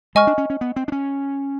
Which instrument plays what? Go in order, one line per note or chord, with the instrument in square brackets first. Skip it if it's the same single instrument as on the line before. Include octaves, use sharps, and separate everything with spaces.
[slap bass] G#3 [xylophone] D#5 G#5 C#6 F6
[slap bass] D4
C#4
C#4
B3
C4
D4
C#4